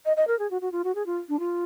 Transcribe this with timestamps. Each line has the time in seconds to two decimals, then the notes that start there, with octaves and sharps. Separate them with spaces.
0.05 D#5
0.17 D#5
0.27 A#4
0.39 G#4
0.51 F#4
0.61 F#4
0.72 F4
0.84 F#4
0.95 G#4
1.06 F4
1.29 D4
1.39 F4